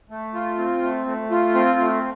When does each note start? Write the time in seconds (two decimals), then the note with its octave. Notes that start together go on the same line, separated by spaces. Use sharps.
0.10 A3
0.34 F4
0.58 C4
0.83 A3
1.07 A3
1.31 F4
1.55 C4
1.79 A3